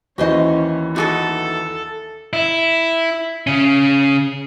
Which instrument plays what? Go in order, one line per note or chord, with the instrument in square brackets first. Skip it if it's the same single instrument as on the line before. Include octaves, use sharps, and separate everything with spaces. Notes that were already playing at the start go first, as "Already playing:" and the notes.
[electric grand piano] D#2 E3 [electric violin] C#4 [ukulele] F#4 C5 D#5
[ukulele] D#4 F4 F#4 [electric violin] A4
[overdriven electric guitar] E4
C#3 C#4